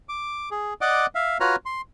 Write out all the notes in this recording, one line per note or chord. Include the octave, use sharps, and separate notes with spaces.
D6
G#4
D5 D#5 F#5 D6
E5 F5
F4 F#4 B4 C#5 A#5 F6
C6